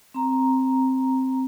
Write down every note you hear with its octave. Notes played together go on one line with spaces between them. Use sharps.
C4 A#5